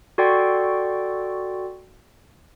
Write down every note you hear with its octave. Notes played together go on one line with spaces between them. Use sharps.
F#4 A4 D5 G5 C6 C#6